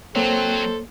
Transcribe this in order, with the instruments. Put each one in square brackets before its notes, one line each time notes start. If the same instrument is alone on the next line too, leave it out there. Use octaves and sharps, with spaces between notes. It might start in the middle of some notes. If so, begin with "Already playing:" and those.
[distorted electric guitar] F#3 [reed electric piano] A#3 C#5 [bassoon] C4 [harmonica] A4 C5